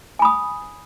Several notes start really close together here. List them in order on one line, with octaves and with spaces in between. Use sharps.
G#5 B5 D#6